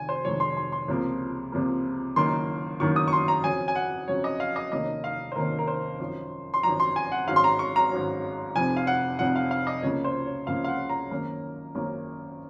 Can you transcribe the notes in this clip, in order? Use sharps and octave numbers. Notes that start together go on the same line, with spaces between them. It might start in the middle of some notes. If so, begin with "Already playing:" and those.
Already playing: F1 F2 D#3 G#5
C5
F1 F2 D#3 G#3 C#5
C6
C6
C6
C#2 C3 F3 A#3
C#2 C3 F3 A#3
F#1 F#2 D#3 A#3 D#4 C6
F#1 F#2 D#3 A#3 D#4 C#6
D#6
C#6
C6
A#5
F2 C#3 F#3 C#4 G#5
G#5
F#5
F2 C#3 F#3 C#4 C#5
D#5
F5
D#5
F1 D#2 D#3 A#3 C#4 D#5
F5
C5
F1 D#2 D#3 A#3 C#4 A#4
A#4
C5
G#1 F#2 F3
C6
G#1 F#2 F3 A#5
C6
G#5
F#5
G#1 G#2 F#3 C#4 F5
C6
A#5
C#6
A#5
G#1 G#2 F#3 C#4
F1 F2 C3 F3 G#5
F5
F#5
F1 F2 C3 F3 F#5
F5
F5
D#5
C#2 C#3 F3 A#3 C#5
C5
C#5
C#2 C#3 F3 A#3 F5
F5
F#5
A#5
G#1 F#2 D#3 A#3 C#4
G#1 F#2 D#3 A#3 C#4